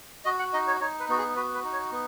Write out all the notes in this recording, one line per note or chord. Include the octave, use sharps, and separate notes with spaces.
F#4 D#5
F#5
D#4 D#5
C#5
D#4 C#5
B4
B3 F#4
G#4
F#4 B4
B4
D#4
C#5
B3